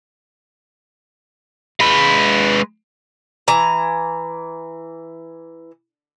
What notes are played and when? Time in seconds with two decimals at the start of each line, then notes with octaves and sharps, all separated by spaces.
1.80 G#3 B4
3.48 E3 A#5